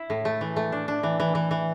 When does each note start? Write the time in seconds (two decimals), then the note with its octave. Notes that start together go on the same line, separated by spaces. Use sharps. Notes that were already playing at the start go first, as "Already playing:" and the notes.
Already playing: E4
0.10 A2
0.25 A3
0.41 E3
0.56 A3
0.72 D4
0.88 D4
1.03 E3
1.20 E3
1.35 E3
1.51 E3